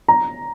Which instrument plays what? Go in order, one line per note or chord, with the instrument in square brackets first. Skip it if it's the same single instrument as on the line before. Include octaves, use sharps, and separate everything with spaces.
[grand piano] A#5